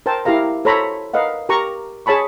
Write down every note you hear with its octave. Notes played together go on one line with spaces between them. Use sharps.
A#4 C5 G5 A5
E4 G4 A#4 F5 A#5
A4 C5 C#5 A#5 B5
A#4 B4 D#5 F5 F#5
G4 A#4 A#5 C#6
G#4 C#5 A5 B5 C#6